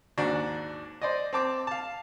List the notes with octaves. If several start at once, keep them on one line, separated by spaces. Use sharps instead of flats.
D#2 G#2 D4 F#4
C5 D5 D#5
C4 A5 D6
F5 A5